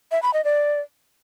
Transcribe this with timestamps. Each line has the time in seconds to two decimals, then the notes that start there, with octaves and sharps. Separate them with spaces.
0.12 E5
0.23 B5
0.33 D#5
0.44 D5